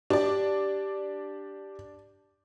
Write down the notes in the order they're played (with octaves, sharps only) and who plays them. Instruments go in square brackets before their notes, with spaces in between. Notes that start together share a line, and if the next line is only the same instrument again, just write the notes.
[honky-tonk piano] D4 D5 [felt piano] G4